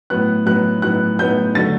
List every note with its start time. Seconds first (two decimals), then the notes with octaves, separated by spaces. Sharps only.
0.10 A2 F#3 B3 F#6
0.46 A2 F#3 B3 F#6
0.82 A2 F#3 B3 F#6
1.19 A2 F#3 B3 G6
1.55 D3 F#3 A3 A6